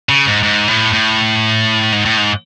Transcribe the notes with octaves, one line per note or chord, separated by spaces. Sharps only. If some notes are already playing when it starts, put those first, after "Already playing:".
C#3
G#2
G#2
A2
A2
G#2
A2
G#2